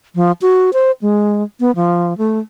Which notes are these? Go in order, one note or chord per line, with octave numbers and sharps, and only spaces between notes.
F3
F#4
C5
G#3
B3
F3
A3